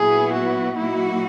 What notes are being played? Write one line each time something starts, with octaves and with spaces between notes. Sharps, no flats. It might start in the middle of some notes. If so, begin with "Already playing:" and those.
Already playing: A#2 F#3 B3 E4 G#4
F#4
A#2 F#3 A#3 D#4 E4 F#4